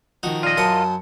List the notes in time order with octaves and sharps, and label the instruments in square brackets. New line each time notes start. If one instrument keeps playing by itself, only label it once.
[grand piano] D#3 F3 [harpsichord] D#4 F#4
[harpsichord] A#2 [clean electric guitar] F4 D#5
[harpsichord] F#2 C6 D#6 [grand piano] A#4 C#7 [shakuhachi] A5